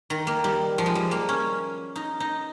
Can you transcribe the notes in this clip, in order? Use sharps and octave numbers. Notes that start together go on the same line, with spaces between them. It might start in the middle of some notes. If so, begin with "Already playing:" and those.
D#3
A#3
G3
F3
G#3
G3
A#3
C#4
D#4
D#4